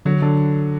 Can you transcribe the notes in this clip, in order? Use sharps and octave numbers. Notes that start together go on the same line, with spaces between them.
D3 F#3
D3